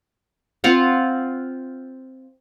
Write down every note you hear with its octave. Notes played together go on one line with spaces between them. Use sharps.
C4 F4 F5 F#5